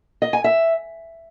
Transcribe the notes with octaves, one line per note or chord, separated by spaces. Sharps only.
D#5
G#5
E5